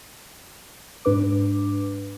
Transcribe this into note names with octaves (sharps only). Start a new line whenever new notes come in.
G#2 D4 B4 D6